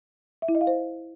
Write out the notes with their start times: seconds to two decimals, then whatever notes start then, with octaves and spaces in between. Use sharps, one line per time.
0.42 E5
0.49 E4
0.55 D#5
0.61 F5
0.67 C5